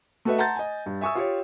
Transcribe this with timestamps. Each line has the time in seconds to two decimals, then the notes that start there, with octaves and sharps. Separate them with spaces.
0.25 A3 F#4 A4 B4 D#5 E5
0.38 F#5 A5 A#5 C6 G6 A6
0.56 D#5 G#5
0.86 G2
1.01 E5 G#5 C#6 D#6 E6
1.15 F4 G4 C#5